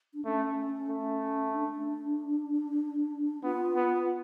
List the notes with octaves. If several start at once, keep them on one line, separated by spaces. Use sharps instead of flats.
D4
A3 C#4
A3
D4
B3 F4
B3